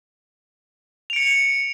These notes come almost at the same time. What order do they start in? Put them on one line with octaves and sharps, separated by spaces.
F7 D7 C#7